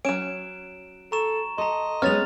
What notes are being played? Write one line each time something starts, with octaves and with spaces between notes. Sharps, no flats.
F#3 C#4 D7 E7
A4 A#5 C#6 E7
A4 D#5 A#5 C6
G#3 B3 C#4 C#5 F6 A6 F7